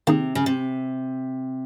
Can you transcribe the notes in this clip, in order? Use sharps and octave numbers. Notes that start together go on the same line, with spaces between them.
C3 D#3 A#3 D#4 G#4
C#3
C3